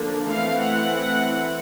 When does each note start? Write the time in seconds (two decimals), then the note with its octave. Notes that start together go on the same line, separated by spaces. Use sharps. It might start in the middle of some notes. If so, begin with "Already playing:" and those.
Already playing: D3 F3 A#3 D4
0.27 E3 A3 C4 F5
0.57 F#5